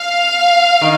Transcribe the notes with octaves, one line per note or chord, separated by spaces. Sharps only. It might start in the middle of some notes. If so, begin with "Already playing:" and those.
Already playing: F5
D#3